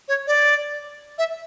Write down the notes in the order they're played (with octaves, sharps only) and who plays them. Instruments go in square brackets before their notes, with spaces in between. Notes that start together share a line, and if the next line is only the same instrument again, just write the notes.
[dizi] C#5
D5
E5